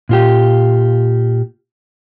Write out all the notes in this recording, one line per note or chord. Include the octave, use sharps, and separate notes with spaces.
A#2 F4 G4